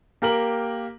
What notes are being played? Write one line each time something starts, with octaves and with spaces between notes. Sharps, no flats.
A#3 G4 A#4 G5 F#7